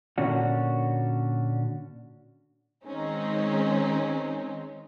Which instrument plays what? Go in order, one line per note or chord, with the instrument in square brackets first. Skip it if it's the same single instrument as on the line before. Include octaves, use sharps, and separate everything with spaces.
[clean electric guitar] A#2 D3 C#4 D4 F#4
[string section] D#3 G#3 C4 C#4 D#4